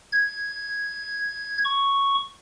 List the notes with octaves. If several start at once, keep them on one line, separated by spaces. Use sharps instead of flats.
G#6
C#6